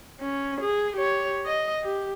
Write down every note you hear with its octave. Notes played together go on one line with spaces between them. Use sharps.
C#4
G#4
G4 C#5
D#5
G4